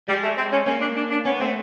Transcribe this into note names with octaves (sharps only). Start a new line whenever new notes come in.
G3 G#3
A3
C4
C#4
A#3 C#4
D4
D4
D4
B3 C#4
A3 C4